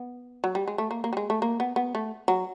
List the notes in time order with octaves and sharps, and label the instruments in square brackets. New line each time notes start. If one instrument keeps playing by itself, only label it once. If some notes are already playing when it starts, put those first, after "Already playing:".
Already playing: [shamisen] B3
F#3
G3
G#3
A3
A#3
A#3
G3
G#3
A3
A#3
B3
B3
A3
F#3